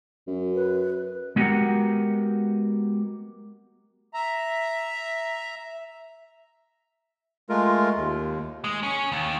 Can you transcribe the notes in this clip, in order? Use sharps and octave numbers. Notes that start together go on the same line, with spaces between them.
F#2
B4
G#3 B3 F#4 G4 A#4 F#5
E5 A#5
G#3 A3 F4 A#4
D#2
G#3
C#4
D#2